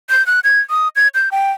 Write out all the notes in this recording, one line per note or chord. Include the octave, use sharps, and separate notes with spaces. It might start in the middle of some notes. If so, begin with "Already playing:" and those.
G6
F#6
G#6
D#6
G#6
G6
G5